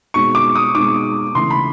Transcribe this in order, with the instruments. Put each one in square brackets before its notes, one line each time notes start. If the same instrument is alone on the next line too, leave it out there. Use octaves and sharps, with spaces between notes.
[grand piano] B2 G#3 C4 D#4 [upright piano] C#6
[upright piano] D6
D#6
[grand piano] B2 G#3 C4 D#4 [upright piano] D6
[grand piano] C#3 E3 A3 [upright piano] C6
[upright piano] B5